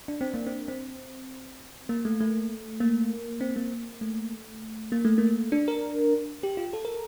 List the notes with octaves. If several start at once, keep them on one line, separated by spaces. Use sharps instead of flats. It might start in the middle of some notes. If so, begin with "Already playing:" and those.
D4
C4
A#3
C4
C4
A#3
A3
A3
A#3
C4
A#3
A3
A#3
A3
A#3
D4
A#4
G4
F4
A4
A#4